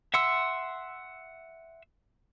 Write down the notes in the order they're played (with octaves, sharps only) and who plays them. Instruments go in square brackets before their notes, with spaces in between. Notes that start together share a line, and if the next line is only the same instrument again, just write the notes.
[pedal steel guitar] E5 F#5 C6 E6